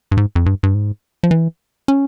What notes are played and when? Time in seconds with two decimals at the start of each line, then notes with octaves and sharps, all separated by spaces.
0.12 G2
0.17 G#2
0.36 F2
0.46 G2
0.63 G2
0.75 G#2
1.23 F3
1.31 E3
1.88 C#4